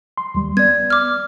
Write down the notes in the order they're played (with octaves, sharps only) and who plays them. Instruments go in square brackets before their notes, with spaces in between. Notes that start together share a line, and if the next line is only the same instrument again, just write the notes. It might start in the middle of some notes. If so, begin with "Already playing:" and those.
[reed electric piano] C6
D#2 G3
[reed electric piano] B3 [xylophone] D5 G#6
[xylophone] D6 F6